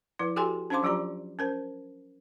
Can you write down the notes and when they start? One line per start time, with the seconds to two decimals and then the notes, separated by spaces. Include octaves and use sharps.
0.19 F3 E4 B4
0.36 F#4 G4 A4 G5 G#5 C6
0.70 C#4 D4 C5 F5 C6 D6
0.83 F3 F#3 F4 G4 D5 A#5
1.39 C#4 A#4 C5